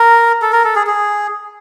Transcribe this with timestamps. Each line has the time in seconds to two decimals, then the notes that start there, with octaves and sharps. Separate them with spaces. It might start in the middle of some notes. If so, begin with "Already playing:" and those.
Already playing: A#4
0.42 A4
0.53 A#4
0.64 A4
0.76 G#4
0.87 G#4